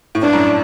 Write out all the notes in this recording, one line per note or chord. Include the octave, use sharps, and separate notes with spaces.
A2
G2 D4
F#2 A2